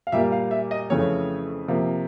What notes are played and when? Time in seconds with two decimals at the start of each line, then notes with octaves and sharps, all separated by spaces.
0.07 F5
0.12 A#2 G3 A#3 E5
0.32 F5
0.51 E5
0.71 D#5
0.90 F2 C#3 E3 A3 C#5
1.68 C3 F3 A#3